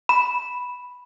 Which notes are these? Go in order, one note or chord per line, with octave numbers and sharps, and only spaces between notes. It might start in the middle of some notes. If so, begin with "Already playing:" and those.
B5